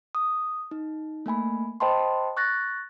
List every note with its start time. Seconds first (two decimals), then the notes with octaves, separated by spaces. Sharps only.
0.15 D#6
0.71 D#4
1.26 A3 A#3 G#5 B5
1.80 C5 D#5 G5 A5 B5 C6
2.37 C#6 F#6 A6 A#6